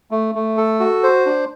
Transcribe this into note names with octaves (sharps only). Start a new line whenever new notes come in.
A3
A3
A4
F#4
C5
D4